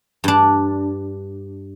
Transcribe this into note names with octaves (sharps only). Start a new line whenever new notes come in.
G2 D4